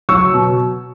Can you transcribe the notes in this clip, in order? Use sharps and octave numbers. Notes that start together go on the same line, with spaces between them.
F#3 C#6 E6
B2